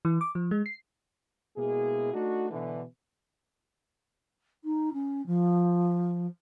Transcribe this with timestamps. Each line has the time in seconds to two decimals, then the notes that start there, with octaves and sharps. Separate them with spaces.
0.05 E3
0.21 D6
0.35 F3
0.51 G#3
0.66 C7
1.56 B2 G#3 A#3 E4 G#4
2.13 A3 D4 D#4 F#4
2.51 B2 D3 E3
4.64 D#4
4.93 C#4
5.26 F3